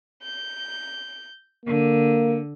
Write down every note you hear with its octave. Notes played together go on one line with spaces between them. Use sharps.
G6
D3 A#3